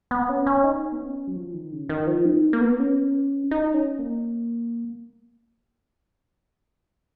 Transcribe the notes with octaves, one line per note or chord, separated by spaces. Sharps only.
B3
C#4
C#4
D#4
B3
C#4
F#3
F3
D#3
C#3
D#3
F3
D#4
A#3
B3
C#4
D#4
C#4
A#3